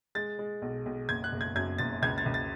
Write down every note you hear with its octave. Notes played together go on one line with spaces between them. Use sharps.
G#3 A6
G#3
B1
B1
F#1 G#6
F#6
F#1
G#6
F#2 G#6
F#1 A6
C#2 G#6
A6
C#2
A6